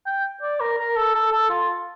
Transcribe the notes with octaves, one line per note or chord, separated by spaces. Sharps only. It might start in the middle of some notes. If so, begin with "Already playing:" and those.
G5
D5
A#4
A#4
A4
A4
A4
F4